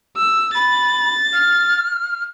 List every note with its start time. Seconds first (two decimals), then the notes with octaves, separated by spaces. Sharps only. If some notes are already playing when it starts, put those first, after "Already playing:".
0.17 E6
0.55 B5 A6
1.33 F6